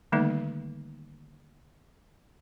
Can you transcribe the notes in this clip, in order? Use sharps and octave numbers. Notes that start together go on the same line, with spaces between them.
D3 D#3 G3 A3 A#3 D#4